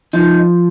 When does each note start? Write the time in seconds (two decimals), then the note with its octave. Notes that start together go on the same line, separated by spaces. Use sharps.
0.13 F3 D#4